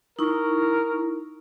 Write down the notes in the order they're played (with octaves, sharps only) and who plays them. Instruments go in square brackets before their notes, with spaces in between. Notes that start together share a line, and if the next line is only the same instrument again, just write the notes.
[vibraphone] D#4 E4 C#6 [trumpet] A#4